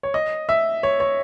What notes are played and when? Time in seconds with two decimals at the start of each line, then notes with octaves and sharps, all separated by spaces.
0.03 C#5
0.14 D#5
0.49 E5
0.83 C#5
1.00 C#5